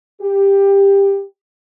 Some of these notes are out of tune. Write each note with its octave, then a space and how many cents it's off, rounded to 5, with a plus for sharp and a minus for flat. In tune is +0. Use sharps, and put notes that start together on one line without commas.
G4 +15